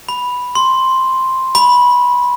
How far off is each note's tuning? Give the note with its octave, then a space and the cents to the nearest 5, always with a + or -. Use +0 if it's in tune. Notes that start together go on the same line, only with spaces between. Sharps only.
B5 +0
C6 +5
B5 -15